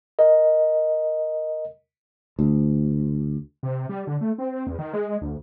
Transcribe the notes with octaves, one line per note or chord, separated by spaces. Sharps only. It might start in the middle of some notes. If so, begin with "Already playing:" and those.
A#4 D#5
D2
C3
G3
D3
A3
C4
E2
D#3
G#3
D2